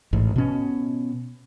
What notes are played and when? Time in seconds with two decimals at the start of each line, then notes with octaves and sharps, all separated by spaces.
0.13 A1 G#2
0.36 B2 C#4